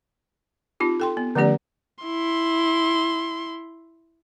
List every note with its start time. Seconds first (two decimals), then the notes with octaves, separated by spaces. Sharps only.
0.80 C4 D#4 F4 G4
1.00 A4 G5 C6
1.17 B3
1.35 D3 F3 A3 C#4 G4 D5
2.04 E4 C6